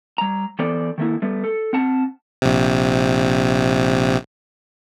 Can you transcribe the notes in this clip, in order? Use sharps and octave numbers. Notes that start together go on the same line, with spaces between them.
G3 A#5
E3 B3 A4 C5 D5
D#3 A3 A#3 E4
G3 A3 B3
A4
C4 F#5 A5
A#1 C3